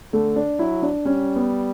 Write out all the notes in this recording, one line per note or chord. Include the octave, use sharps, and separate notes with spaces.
D3 A3
D4
F#3 E4
D4
G3 C#4
B3